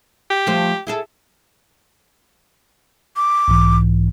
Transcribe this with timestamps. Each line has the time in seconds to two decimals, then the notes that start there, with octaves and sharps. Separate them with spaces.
0.30 G4
0.47 F3 A3 C5
0.87 E4 G#4 A4
3.16 D6
3.48 B1 G#2 E3